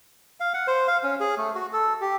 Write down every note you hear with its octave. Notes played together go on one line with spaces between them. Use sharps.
F5
F#5
C5
F5
C#4
G#4
A3
F#4
A4
G4